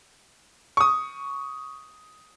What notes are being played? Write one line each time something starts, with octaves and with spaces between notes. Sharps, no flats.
C#6 D#6